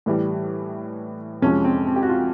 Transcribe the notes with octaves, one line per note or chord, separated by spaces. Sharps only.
A2 E3 G3
F2 C3 F3 G#3 C#4
C4
C4
G4
F#4
F4